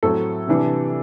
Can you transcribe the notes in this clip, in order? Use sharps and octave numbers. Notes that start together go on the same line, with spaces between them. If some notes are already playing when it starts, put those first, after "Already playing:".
A2 F#3 C4 A4
C3 E3 G3 D4